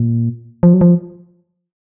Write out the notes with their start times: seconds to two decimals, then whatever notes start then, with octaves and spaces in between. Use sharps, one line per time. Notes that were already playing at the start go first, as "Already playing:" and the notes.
Already playing: A#2
0.63 F3
0.74 F#3
0.81 F3